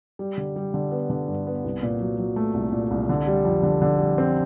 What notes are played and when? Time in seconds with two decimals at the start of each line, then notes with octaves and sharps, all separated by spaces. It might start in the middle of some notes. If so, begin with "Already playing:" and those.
0.19 G3
0.38 D3
0.56 G3
0.74 D3
0.92 B3
1.10 D3
1.28 G2
1.47 B3
1.64 C2
1.83 A#2
2.01 F#3
2.18 F#3
2.36 A3
2.54 C2
2.73 A#2
2.91 C2
3.09 D3
3.27 G3
3.45 F2
3.63 D3
3.82 D3
3.99 G3
4.18 C4